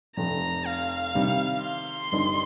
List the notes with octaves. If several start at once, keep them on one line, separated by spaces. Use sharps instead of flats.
F1 F2 C3 A#5
F5
C3 D#3 G3
C6
G1 G2 G3 D#4